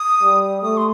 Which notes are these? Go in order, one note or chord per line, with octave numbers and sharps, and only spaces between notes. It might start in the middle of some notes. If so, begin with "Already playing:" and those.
Already playing: D#6
G3
A3 D#6
C6